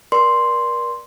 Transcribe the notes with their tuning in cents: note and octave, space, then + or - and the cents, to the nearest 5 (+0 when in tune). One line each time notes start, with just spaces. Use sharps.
A#4 +35 D5 +0 C6 +0